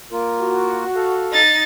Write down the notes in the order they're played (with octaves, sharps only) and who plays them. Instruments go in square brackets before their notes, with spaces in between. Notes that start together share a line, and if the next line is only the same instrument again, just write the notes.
[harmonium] A#3 F4 A#4
[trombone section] F#4
[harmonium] A4 F5
[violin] D#4 A6